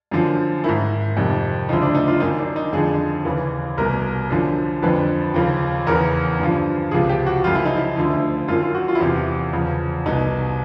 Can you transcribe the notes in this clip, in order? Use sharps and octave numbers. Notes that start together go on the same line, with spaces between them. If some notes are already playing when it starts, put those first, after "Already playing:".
F#2 D3 F3
G#2 D#3 E4
F2 C3 D#3
D2 C#3 F3 D#4
D4
D#4
F4
F#2 D#3 D#4
D4
D#4
F2 D3 F3 G#4
D#2 C#3 E3
C2 B2 A#4
F#2 D3 F3
F2 D3 F3 B4
D#2 C#3 F3
E2 C#3 E3 A#4
G2 D3 F3
C#2 C3 F3 G#4
G4
F#4
F#2 C#3 F3 F4
E4
D#4
E4
D2 D3 F3
F#2 D#3 F4
F4
F#4
F4
E4
E2 C3 E3 F4
E2 C#3 F3
C2 B2 D#4